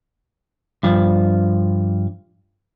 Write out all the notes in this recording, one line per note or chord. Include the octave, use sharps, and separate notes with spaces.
G2 F3